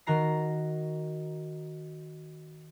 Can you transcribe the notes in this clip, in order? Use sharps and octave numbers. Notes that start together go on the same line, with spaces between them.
D#3 F#4 A#5 C7